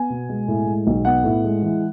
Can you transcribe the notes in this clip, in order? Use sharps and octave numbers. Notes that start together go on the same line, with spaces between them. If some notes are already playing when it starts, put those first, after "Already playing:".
Already playing: B3 G#5
B2
G#3
A2
G#3
B1
B3 F#5
A2
G#3
E3